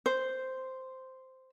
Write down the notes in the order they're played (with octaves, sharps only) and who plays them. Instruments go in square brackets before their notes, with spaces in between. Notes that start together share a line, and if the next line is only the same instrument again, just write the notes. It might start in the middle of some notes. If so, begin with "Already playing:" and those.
[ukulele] C5